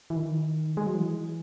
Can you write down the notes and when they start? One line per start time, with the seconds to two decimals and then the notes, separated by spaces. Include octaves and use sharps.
0.10 E3
0.17 D#3
0.77 G#3
0.86 F#3
0.95 E3